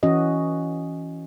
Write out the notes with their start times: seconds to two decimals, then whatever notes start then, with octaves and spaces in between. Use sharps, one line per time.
0.03 E3 C#4 F#4 D#5